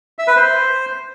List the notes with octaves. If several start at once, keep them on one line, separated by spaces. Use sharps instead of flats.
E5
B4
C5